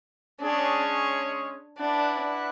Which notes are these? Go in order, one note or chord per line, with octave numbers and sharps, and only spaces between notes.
G#3 C#4 D4 G#4 C#5
D4 E4 B4 D5 F#5